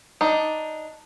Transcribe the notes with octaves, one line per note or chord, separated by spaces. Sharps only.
D4 D#4